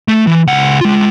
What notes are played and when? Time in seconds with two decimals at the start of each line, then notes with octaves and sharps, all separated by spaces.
0.08 A3
0.27 E3
0.47 C#2 F#5
0.81 G#3 F4